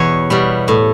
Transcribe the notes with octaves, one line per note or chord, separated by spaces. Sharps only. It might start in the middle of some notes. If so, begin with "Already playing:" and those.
Already playing: E2 B2 G3 C#5
B2 G3
A2